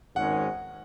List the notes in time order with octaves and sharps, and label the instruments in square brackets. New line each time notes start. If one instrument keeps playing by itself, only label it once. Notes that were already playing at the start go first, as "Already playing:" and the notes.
[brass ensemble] G#1 G#2 D#3 G#3 C#4 [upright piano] F#5